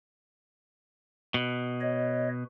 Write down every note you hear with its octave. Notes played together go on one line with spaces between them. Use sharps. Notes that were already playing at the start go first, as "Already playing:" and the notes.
B2
C#5 D#5